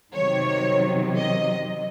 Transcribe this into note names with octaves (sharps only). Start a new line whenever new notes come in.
C3 D#3 F#3 C#5
D#5